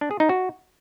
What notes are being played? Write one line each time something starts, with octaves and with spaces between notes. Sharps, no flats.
D4
G#4
D#4
F#4